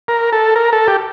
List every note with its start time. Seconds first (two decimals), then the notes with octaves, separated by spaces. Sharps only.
0.08 A#4
0.33 A4
0.56 A#4
0.73 A4
0.88 G4